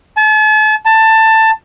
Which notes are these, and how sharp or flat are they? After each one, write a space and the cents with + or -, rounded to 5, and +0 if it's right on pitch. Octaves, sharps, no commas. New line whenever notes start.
A5 -40
A5 +15